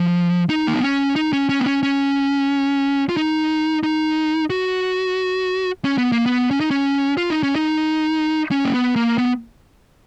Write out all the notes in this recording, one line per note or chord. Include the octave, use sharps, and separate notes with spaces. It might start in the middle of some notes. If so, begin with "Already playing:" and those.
Already playing: F3
D#4
A#3
B3
C#4
D#4
C#4
C#4
B3
C#4
C#4
F4
D#4
D#4
F#4
C#4
B3
A#3
B3
C#4
D#4
C#4
F4
D#4
C#4
D#4
C#4
A#3
B3
A#3
B3